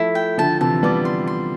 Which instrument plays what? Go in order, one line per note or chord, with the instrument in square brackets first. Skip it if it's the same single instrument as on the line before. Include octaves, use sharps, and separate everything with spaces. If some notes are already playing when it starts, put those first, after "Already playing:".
Already playing: [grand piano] F3 A3 [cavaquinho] E4
[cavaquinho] G5
[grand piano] D3 F3 [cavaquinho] A5
[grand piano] C3 E3 [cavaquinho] A5
[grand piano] G3 B3 [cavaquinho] D5
[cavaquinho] C6
C6